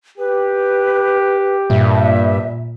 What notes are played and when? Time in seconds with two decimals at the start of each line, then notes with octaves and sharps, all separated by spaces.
0.18 G4 B4
1.70 G2 A#2 E5